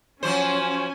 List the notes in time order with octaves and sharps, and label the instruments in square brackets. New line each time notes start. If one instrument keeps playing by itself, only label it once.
[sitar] F3 F#3 C5 [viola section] C#4 G#5